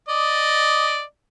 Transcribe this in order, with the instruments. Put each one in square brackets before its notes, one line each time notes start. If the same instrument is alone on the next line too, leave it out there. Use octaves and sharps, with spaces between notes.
[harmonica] D5 D#5